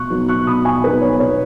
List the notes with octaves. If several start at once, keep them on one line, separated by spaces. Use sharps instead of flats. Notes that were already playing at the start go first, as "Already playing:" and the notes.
Already playing: B2 C#6 F#6
F#3 B3 D#4
C#6 F#6
B2 B5 D#6
G#5 C#6
F#3 B3 D#4 B4
C#5
B2 C#5